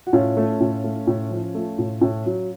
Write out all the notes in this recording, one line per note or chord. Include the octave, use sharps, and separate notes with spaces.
F#4
A2 C#4 F4
A3
A2
A3
A2
F3
A3
A2
A2
F#3